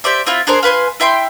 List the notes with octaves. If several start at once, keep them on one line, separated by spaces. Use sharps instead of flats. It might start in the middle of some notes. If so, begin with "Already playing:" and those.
G4 C5 D5 E5
C4 E4 F4
D4 G#4 A#4 C5
F4 B4 G#5 C6
E4 E5 G5 C6